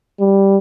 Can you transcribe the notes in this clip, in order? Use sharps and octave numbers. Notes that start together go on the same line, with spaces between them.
G3